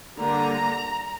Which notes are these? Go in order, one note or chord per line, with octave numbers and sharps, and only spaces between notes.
D3 G3 A#3 A#5